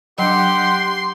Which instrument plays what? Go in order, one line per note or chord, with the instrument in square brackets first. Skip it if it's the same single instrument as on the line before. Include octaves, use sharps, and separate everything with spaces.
[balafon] F#3 D4 [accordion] G4 F#5 G5 [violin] C6